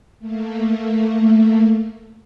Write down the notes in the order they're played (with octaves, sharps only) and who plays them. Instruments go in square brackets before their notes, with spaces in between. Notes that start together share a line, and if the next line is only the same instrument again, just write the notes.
[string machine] A3 A#3